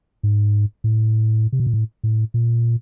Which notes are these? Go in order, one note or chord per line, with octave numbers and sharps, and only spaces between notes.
G#2
A2
C3
B2
A#2
A2
A2
A#2